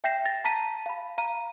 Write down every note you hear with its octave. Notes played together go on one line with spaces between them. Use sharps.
E5 G5 G6 A#6 C7 E7
A6 A#6
A5 A#5 B6 D#7
F5 B5
F5 A#5 D#7